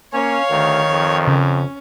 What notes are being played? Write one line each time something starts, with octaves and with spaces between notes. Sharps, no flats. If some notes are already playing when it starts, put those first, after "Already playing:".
A#3 C#4 C#5 F5
D2 D#3
F2
C#3 C#4